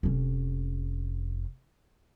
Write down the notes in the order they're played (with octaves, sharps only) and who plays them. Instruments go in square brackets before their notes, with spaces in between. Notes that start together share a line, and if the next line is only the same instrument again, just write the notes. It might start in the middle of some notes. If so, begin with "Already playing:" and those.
[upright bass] F1 C#4